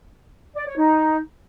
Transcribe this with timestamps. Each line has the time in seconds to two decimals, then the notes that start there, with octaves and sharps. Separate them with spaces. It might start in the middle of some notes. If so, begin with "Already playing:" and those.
0.56 D5
0.66 C#5
0.77 D#4